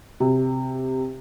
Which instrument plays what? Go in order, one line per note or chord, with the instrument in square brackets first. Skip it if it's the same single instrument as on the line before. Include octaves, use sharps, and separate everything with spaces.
[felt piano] C3